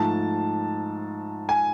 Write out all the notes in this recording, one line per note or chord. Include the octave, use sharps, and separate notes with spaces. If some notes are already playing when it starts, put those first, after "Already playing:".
Already playing: G#2 F3 A3 A5
G#5